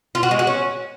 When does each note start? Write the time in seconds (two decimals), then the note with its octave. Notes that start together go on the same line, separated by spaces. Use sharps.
0.15 F4
0.23 F#4
0.31 G#3
0.39 F#4
0.47 C#4